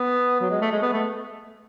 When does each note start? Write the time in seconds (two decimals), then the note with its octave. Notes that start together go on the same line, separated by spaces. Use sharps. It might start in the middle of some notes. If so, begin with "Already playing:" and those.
Already playing: B3
0.40 F#3
0.50 G#3
0.61 A3
0.72 G#3
0.82 B3
0.92 A3